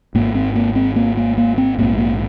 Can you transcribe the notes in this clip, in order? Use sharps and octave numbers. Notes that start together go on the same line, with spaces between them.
G#1 G#2 A#3
C4
A#3
C4
A#3
A#3
A#3
C4
A#1 G#2 A#3
A#3